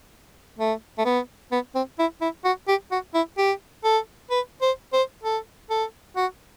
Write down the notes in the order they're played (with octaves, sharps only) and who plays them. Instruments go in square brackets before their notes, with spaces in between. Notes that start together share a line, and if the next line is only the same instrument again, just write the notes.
[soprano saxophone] A3
A3
B3
B3
C4
E4
E4
F#4
G4
F#4
E4
G4
A4
B4
C5
C5
A4
A4
F#4